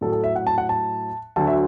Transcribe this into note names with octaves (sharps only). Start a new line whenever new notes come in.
A2 F#3 A4
A4
E5
F#5
A5
F#5
A5
D2 D3 F#3 A5
E5